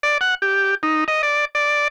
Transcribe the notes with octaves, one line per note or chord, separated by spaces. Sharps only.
D5
F#5
G4
D#4
D#5
D5
D5